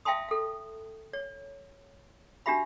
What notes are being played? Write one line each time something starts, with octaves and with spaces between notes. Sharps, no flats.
E5 F5 G5 A5 C6 D#6
A4 F5
C#5
D4 F#4 G4 E5 F5 B5